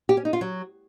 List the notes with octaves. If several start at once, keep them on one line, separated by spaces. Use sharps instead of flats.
G4
C#4
D#4
F4
F#3